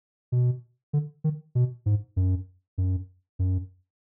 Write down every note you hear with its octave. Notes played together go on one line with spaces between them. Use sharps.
B2
D3
D#3
B2
G#2
F#2
F#2
F#2